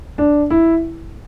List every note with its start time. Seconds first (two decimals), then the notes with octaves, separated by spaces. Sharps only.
0.18 D4
0.50 E4